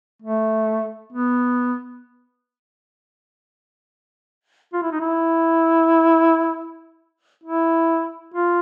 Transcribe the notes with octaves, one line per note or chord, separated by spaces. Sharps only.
A3
B3
F4
E4
D#4
E4
E4
F4